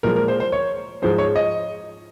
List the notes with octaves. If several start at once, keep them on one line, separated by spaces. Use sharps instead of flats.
A#2 F3 G#3 A#4
A#4
C5
C5
C#5
G#2 F3 G#3 C5
C#5
D#5